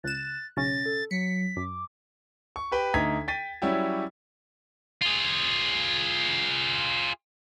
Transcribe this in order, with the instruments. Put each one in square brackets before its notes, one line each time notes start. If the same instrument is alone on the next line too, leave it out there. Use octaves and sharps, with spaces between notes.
[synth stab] C#2 E7 [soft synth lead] F#6 [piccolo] A6
[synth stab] B1 C#3 C#4 [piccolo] A6 [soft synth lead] A#6
[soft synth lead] A4
[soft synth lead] F#3 [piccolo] B6 [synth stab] C#7
[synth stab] F#2 [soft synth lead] D6
[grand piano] C#6
G4 B4 G5
D2 D#4 A#5 G#6 B6
G5 A6 B6 D#7
F#3 G3 C#4 E4 G4
[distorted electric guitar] F4 G#4